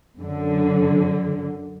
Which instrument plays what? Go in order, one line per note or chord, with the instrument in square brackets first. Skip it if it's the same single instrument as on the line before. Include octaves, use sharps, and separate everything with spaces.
[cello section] F#2 D3